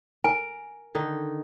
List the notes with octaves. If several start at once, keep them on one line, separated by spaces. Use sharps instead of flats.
A#4 G#5
D3 D#3 D#4